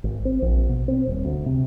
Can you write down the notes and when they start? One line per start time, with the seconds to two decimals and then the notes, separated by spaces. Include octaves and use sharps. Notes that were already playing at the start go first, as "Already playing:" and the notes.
0.04 G#1
0.25 C4
0.42 A#1
0.69 B2
0.88 C4
1.07 D#1
1.25 D2
1.46 C3